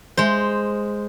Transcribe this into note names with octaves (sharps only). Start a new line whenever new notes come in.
G#3 C5